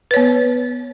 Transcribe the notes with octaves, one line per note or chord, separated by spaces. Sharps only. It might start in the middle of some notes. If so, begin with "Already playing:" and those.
B3 B4 C#5